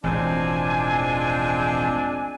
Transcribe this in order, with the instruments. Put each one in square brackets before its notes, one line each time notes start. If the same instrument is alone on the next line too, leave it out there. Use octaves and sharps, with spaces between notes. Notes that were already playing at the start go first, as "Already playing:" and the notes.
[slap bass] E1 A1 [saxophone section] F3 G#3 C4 [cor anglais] D4 [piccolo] G#5